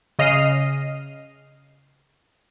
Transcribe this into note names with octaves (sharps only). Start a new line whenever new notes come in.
C#3 D#5 F6 C7 D#7